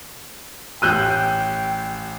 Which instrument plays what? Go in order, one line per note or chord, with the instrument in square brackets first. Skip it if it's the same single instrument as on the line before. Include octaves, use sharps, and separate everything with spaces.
[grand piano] A1 G4 D#7 [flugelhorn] G5 [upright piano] E6 F#6 G6